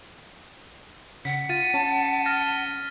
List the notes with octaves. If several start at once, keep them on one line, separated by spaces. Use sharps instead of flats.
C#3 F#5 B6
F4 A6 D#7
C#4 A5
F6 A6 A#6